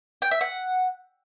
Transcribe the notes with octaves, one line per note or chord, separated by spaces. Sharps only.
G5
E5
F#5